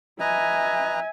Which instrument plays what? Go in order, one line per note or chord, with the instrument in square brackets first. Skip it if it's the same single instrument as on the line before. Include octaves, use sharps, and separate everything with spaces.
[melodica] B4 D#5 A#5 [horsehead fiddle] E5 G#5